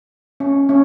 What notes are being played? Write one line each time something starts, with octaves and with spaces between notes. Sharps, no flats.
C#4
C#4